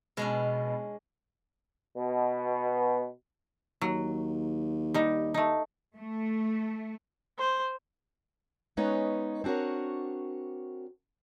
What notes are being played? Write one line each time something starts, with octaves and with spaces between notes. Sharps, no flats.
B2 G#3 C#4 D4
B2
D#2 F#3
G3 D#4
A3 D#4
A3
C5
G#3 B3 C#4 D#4 B4 C#5
C4 D4 F#4 A#4 C#5